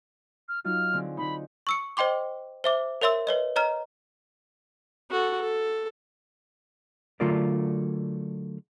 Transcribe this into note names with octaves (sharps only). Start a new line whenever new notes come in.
F6
F#3 D#4 F4 F6
D3 C4 G#4
D3 D#4 B5
C#6 E6 C#7
C5 D#5 G5 C6 D6
C5 E5 D6
A#4 C#5 E5 C6 E6
B4 C#5 D#5
C#5 D#5 A#5 F6
F#4 A4
A4
D3 F#3 A3 F4 A#4 D5